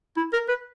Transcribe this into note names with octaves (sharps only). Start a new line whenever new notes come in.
E4
A#4
B4